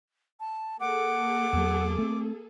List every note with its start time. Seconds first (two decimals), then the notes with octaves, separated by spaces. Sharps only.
0.40 A5
0.80 A#3 G#4 A4 F#5 D6
1.53 E2 F#3
1.99 A3 C4